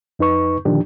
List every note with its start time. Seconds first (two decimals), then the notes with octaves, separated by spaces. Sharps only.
0.19 F2 D#4 B4 C#6
0.65 A#2 D3 D#3 F3 D4 G4